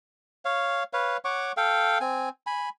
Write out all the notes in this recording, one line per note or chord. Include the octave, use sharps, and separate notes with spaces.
C#5 F5
B4 C#5 F5
C#5 F#5 C#6 D6
A4 F5 G5
C4 G#5
G#5 B5